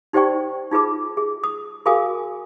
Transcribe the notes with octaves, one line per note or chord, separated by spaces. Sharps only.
D#4 G4 C5 D5 G5 C#6
D#4 F4 G#4 B4 D6
G#4
D#6
F#4 G#4 A#4 F5 G#5 D#6